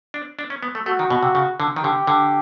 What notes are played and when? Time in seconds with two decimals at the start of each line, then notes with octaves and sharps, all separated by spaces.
0.14 D4
0.39 D4
0.50 C#4
0.63 B3
0.75 A3
0.86 A3 F#4
0.99 D#3
1.10 B2
1.23 C3
1.35 C#3
1.60 D3
1.76 D#3
1.83 D3 G4
2.07 D3